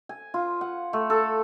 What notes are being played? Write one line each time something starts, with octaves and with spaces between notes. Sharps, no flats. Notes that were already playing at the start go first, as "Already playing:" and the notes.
G#5
F4
F#5
A3
A4